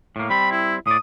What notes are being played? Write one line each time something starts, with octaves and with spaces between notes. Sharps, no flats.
A2 A#3
G3 C4 B5
E4
A2 D5 D#6